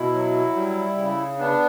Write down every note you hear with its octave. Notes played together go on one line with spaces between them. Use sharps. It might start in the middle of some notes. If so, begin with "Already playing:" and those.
Already playing: B2 E4
F#3
G3
C#3
B3 D4